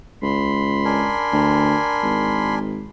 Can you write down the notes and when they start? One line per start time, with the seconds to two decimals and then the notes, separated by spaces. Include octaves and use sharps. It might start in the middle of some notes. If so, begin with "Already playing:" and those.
0.22 C#2 B5 C6
0.85 D4 A#4 G#5
1.33 D2
2.03 G#1